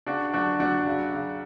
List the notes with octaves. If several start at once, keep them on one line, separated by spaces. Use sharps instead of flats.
C#3 D4 F#4
F#2 D4 F#4
F#2 D4 F#4
C#3
C#3